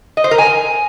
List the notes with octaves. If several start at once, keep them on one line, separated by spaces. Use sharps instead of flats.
D#5
C5
A#4
G#5